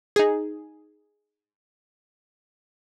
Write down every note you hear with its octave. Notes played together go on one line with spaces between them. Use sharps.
D#4 G#4